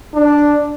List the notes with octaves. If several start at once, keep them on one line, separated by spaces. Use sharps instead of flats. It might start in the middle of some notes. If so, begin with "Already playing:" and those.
D4